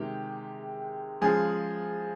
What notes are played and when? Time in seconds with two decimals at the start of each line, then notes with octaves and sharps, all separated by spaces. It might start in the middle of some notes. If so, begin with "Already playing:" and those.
Already playing: C3 D#3 G#3 G4
1.21 C#3 F3 G#3 G#4